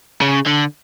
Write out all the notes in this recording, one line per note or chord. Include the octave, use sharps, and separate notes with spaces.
C#3
D3